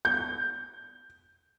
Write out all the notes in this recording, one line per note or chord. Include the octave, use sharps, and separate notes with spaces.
G6